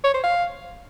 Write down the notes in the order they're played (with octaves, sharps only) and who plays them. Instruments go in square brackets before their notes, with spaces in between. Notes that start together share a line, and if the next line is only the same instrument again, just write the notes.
[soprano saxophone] C#5
C5
F5